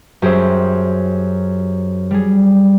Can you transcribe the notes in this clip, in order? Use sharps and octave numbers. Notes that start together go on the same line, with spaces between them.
F#2 G4 G#4 C5 E5
G3 G#4